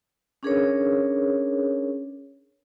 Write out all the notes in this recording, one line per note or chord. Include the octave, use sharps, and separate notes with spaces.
C#4 D4 G#4 A#4 B4 C#5